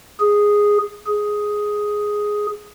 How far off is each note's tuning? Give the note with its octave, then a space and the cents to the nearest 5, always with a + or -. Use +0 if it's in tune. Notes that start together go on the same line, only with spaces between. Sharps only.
G#4 -5
G#4 +5